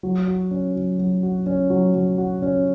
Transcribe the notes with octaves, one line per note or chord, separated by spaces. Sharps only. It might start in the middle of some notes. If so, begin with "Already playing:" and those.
F#3
F#4
C#4
F#3
F#3
F#4
C#4
F#3
F#3
F#4
C#4